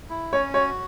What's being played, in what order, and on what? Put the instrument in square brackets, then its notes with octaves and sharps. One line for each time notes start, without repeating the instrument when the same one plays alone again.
[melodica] E4
[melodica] C#4 [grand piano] C#5
[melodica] F#4 [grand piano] C#5